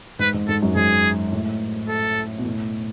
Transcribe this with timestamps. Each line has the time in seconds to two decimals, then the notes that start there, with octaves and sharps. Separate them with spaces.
0.19 G#2 B4
0.34 G#2
0.48 G#2 A4
0.62 F#2
0.76 G#2 G#4
1.32 A2
1.89 A4
2.38 B2
2.45 A2